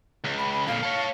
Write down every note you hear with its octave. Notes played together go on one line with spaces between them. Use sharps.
C#2
B5
B5
F2 A#2 F5
A4 C#5